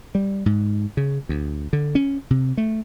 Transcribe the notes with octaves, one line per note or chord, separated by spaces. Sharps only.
G3
G#2
C#3
D2
D3
C#4
C3
A3